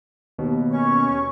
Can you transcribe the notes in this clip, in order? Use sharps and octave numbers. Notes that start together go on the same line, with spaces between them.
D#2 B2
C#4 C#6